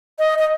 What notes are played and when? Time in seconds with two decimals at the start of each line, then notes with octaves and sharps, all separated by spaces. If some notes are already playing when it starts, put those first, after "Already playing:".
0.19 D#5
0.38 D#5